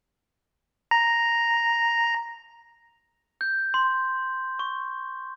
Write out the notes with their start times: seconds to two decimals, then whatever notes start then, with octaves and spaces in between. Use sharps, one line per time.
0.91 A#5
3.41 G6
3.74 C6
4.59 C#6